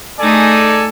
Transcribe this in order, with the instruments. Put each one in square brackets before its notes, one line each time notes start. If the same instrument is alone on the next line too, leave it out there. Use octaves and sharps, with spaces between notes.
[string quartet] A3 D#4 G#4 [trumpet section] A4 D5 G#5